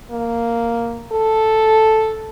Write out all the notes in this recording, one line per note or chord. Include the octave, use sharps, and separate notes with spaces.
A#3
A4